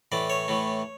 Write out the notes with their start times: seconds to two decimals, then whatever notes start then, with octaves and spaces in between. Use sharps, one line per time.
0.12 A2 E3 A3 D5
0.30 C#5
0.48 A2 E3 A3